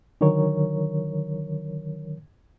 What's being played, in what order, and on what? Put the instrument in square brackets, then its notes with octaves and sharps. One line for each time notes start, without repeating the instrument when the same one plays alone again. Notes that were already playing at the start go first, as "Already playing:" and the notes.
[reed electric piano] D3 D#3 F#3 A#4 C#5